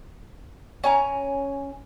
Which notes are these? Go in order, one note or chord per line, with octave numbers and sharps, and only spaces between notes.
C#4 G#5 A#5